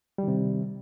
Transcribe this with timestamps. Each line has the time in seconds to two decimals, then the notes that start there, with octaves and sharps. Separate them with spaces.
0.18 G3
0.23 D#3
0.28 C3